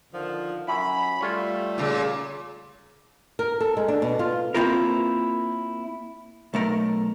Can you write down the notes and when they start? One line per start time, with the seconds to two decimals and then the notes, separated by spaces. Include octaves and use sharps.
0.12 D3 D#3 F3
0.67 F#2 E4 B5
1.21 G3 A3 F4 C#5
1.78 A#2 C#3
3.39 A#4
3.61 A4
3.77 G#3
3.88 D4
4.02 B2
4.19 F4
4.55 A#3 C4 D4 E4 F4 A#4
6.54 B1 A3 A#4